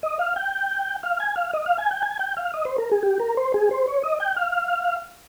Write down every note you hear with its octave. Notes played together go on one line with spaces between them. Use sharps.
D#5
F5
G5
F5
G#5
F5
D#5
F5
G#5
G5
G#5
G5
F5
D#5
C5
A#4
G#4
G4
A#4
C5
G#4
C5
C#5
D#5
G5
F5